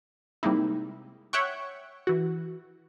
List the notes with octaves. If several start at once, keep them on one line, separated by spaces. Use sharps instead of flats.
C3 G3 G#3 A#3 D#4 E4
C#5 E5 F#5 G5 C#6
E3 F#4